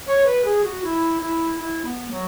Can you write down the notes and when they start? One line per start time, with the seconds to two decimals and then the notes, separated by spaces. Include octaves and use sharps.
0.07 C#5
0.26 B4
0.45 G#4
0.64 F#4
0.84 E4
1.22 E4
1.60 E4
1.85 B3
2.11 F#3